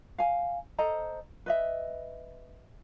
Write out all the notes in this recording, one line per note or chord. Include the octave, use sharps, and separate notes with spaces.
F5 G#5
A4 C5 D#5 A#5
B4 D#5 E5